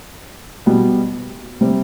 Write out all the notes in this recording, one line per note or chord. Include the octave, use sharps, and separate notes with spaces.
B2 G3 B3
C3 G3 C4